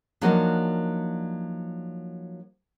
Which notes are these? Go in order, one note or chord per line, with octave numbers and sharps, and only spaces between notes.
F3 F#3 A#3 D4 D#4 F#4